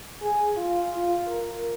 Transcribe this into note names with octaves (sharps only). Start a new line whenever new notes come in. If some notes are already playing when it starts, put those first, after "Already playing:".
G#4
F4
F4
A#4